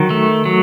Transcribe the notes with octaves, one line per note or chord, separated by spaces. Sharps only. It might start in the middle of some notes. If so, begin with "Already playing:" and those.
Already playing: D#3 F#3
A3
F#3